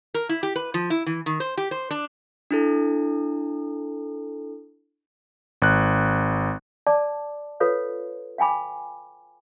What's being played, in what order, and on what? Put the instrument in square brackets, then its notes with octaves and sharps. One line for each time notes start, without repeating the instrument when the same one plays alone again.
[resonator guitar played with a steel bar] A#4
E4
G4
B4
F3
E4
E3
D#3
C5
G4
C5
D4
[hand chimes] D4 E4 A4
[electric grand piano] G#1 F#6
[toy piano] D5 A5 D6
F4 A4 B4 C#5 F5
F5 G5 G#5 B5 D6